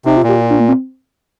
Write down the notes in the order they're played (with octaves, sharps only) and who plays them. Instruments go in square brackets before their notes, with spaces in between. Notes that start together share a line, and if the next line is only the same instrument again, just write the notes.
[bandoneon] C3 [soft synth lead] D#4
[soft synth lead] F4
[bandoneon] A#2
[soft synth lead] G4
F4
D4
A#3
C4